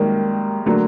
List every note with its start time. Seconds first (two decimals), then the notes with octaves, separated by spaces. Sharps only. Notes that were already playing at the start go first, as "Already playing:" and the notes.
Already playing: F#2 D#3 G3 G#3 A#3
0.66 D3 F#3 A3 A#3